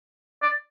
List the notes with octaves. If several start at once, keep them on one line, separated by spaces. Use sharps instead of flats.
D5